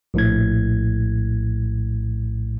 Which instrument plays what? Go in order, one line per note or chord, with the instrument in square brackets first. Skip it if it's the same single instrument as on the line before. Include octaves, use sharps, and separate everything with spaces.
[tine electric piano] A#1 A2 G#6